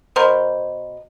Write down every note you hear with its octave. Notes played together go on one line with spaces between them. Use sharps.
B2 A#4 C5